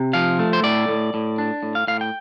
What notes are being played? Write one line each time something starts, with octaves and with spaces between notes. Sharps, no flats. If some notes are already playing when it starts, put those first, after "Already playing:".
Already playing: C3
F3 F5
A3
C5
A2 D5
A2
A2
D4
A2
F5
A2 F5
G5